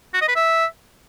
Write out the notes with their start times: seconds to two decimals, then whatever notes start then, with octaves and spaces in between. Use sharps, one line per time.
0.14 F#4
0.21 D#5
0.28 B4
0.35 E5